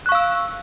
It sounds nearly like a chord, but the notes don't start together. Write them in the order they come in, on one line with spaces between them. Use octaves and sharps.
F#6 C#6 F5 E6